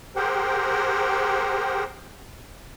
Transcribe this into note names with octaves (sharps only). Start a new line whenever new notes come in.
G4 G#4 A#4 C5 F#5 G5